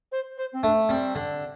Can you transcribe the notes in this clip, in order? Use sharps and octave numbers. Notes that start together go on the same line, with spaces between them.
C5
C5
C4
A3 D4
G3 C4
D3